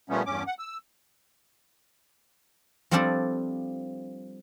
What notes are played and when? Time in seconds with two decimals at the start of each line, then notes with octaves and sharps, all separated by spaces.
0.10 A#2 F3 G3 A3 B3 C#4
0.26 E2 G2 C#4 D6
0.47 F#5
0.59 E6
2.91 F3 G3 C4 D4 A4 D5